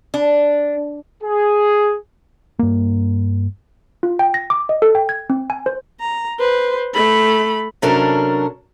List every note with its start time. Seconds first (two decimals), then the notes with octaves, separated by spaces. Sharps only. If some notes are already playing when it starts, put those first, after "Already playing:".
0.14 D4
1.23 G#4
2.59 G2 A#3
4.03 F4
4.19 G5
4.34 A#6
4.50 D6
4.69 D#5
4.82 A4
4.95 G5
5.09 G#6
5.30 C4
5.50 G#5
5.66 C5
6.00 A#5
6.39 B4 C5
6.94 A3 B5
7.82 C3 F#3 C#4 D4 A4 A#4